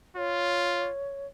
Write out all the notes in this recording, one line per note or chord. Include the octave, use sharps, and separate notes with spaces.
F4 C#5